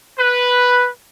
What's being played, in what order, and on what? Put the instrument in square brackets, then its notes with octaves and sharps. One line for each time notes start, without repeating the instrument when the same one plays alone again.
[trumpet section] B4